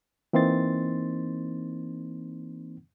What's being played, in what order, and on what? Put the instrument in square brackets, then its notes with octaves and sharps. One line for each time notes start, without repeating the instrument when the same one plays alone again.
[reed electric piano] E3 A#3 C4 D#4 C6 A6